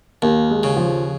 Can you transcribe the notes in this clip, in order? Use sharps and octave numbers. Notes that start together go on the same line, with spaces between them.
D#2 A#3
G#3
C#3
F3